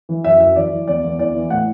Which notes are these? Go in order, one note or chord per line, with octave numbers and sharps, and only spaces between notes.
E3
F#2 E5
F#2 E5
E3 D5
E3
E2 D5
E2
E3 D5
E3
A2 F#5